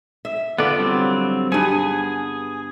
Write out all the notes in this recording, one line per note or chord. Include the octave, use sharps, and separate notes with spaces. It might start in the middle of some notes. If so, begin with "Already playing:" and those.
E5
D3 B3 F4 D5
F#3 G3 C4
G2 B3 G#4 G#5